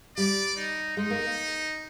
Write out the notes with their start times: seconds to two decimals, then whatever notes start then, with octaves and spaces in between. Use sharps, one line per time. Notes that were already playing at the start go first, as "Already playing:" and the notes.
0.17 G3 D5
0.56 D#4
0.97 G#3 D#4
1.10 A#3